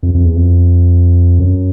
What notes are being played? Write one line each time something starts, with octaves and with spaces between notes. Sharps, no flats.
F2
F2
E2
F2
F#2